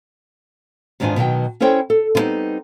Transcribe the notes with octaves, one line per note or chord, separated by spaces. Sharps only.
E2 G#2 D#3 D4 F4 G#5
B2 D#3 F#3 G5
C#4 E4 A4 C5 C#5 G5
A4
D3 G3 B3 C4 D#4